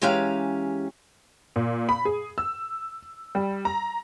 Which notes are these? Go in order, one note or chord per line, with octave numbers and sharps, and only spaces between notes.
E3 G#3 C#4 G4 F5 A#5
A#2
B5
G#4
E6
G3
A#5